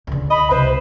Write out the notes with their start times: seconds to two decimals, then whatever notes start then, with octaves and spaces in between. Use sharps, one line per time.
0.07 C#2 D3
0.30 D#5 B5
0.51 C2 B4 C5